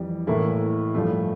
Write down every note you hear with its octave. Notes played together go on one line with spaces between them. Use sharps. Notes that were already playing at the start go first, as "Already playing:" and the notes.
Already playing: F2 E3 G3
A2 E3 A#3 E4 A4
G2 F3 A3